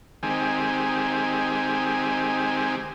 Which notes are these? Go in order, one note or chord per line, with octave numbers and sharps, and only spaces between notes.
D#3 G#3 C4 G4 G#5